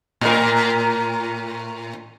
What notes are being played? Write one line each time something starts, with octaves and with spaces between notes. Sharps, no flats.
A2 A#4